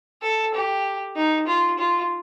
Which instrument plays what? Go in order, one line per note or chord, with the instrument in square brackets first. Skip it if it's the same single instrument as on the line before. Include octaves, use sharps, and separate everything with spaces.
[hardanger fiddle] A4
G4
D#4
F4
F4